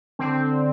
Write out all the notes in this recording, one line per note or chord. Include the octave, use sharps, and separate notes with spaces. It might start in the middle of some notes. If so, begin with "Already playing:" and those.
D3 C4